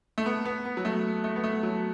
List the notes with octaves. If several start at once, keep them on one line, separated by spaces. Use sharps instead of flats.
A3
B3
B3
B3
F#3
A3
A3
B3
A3
F#3